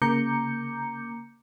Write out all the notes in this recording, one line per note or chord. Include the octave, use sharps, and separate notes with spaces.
C#3 A#3 A#5 D6 G6 C#7